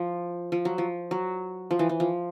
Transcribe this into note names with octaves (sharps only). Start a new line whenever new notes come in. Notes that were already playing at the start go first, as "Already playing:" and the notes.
Already playing: F3
F3
F#3
F3
F#3
F3
E3
E3
F3